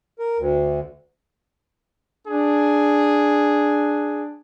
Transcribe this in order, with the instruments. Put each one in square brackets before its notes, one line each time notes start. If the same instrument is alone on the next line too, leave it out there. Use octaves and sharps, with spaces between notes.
[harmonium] A#4
D2
[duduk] D4 [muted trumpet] G#4